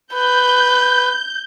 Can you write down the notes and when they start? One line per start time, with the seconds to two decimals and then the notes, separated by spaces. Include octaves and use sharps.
0.14 B4 G6